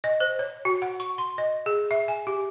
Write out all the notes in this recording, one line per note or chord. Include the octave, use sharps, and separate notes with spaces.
D#5
C5
C#5
F#4
F#5
C#6
C6
D#5
G#4
E5
G#5
G4